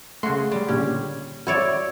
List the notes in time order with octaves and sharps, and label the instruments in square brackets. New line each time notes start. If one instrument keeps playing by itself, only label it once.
[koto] C#3 F#4 [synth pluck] A3 C6
[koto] G3
[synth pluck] A#2 D3 G4 [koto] C#4
[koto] E4 C#5 D5 [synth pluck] F#4